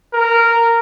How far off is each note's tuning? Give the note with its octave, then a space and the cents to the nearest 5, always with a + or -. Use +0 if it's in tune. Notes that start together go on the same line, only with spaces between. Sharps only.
A#4 -10